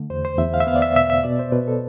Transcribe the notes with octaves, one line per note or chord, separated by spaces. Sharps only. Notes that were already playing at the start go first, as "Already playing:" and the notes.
Already playing: D3 A3
E2 C5
C5
E2 E5
F5
E5
B3 F5
D5
E5
B2 E5
E5
B2 D5
C5
B2 B4
A4